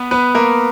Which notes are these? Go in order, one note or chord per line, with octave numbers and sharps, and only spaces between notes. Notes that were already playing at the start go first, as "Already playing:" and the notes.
Already playing: B3 B4
B3 B4
A#3 A#4